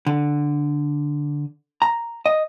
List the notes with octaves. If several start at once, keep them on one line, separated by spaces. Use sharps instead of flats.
D3
A#5
D#5